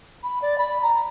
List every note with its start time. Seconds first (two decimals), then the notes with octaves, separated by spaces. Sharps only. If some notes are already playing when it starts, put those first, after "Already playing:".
0.23 B5
0.42 D5
0.58 B5
0.83 A#5